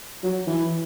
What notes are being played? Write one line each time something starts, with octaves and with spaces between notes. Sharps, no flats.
F#3
E3